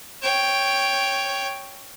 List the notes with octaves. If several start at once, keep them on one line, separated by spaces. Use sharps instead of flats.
C#5 G5